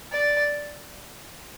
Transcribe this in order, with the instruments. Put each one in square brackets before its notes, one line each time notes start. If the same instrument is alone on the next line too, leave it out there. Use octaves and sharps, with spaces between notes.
[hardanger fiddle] D5